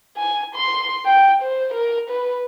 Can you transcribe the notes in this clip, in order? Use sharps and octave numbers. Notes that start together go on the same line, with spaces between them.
G#5
C6
G5
C5
A#4
B4